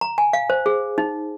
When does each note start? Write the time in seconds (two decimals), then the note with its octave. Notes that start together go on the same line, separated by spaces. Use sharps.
0.01 A#5
0.18 G#5
0.33 F5
0.50 C5
0.66 G#4
0.98 D#4